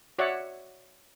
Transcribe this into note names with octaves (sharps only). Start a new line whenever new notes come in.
F#4 C#5 D5 E5 F#5